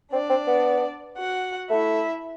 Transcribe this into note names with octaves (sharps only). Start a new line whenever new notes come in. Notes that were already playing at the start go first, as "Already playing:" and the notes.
C4 D4 D5
C4
B3
F#4 F#5
A3 E4 E5